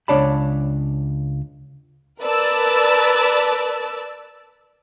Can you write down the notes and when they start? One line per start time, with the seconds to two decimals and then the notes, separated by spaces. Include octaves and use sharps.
0.08 C#2 D4 C#5 D5 A5 B5
2.21 A#4 B4 D5 A5 E6